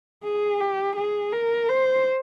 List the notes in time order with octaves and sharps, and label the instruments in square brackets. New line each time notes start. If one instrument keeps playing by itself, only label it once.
[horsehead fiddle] G#4
G4
G#4
A#4
C5